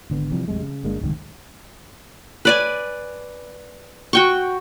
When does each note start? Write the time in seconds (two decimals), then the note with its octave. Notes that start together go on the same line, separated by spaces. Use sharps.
0.10 G#1 D3 B3
0.32 C3 E3 F3 G3
0.48 A#1 F2 G3 G#3
0.60 C#3
0.84 G1 G#3 A#3 D4
1.01 D1 C2 G#2 D#3
2.45 B4 D5 G#5
4.13 F#4 G5 C#6